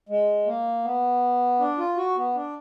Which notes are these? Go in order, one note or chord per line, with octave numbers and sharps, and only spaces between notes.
G#3
A#3
B3
D4
F4
F#4
B3
D4